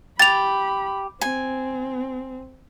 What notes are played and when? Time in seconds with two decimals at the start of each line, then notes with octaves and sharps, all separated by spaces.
0.19 G4 B5 A6 F7
1.21 C4 G#5